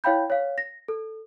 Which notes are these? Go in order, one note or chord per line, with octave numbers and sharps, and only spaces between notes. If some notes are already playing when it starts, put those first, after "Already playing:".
E4 C#5 F5 G5 B5 G6
C#5 F5
A#6
A4